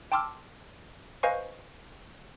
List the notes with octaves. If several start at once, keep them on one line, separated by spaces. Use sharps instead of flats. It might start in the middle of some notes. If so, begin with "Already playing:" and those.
G5 A5 C6 D6 E6 F6
B4 C5 D#5 F5 G#5 C#6